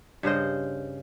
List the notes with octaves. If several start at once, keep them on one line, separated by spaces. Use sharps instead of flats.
G2 C#3 C5 D#5